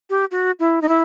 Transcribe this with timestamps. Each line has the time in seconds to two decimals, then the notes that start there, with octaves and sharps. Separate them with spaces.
0.10 G4
0.31 F#4
0.60 E4
0.82 D#4
0.89 E4